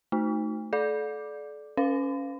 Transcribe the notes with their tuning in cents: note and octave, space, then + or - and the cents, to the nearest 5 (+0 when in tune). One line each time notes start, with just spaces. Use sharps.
A3 +0 D#4 +0
A4 -35 D5 +0 D6 +0
C#4 +0 B4 +45 F5 +0